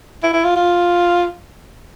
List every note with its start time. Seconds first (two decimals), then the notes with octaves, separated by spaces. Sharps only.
0.23 E4
0.33 E4
0.44 F4
0.56 F4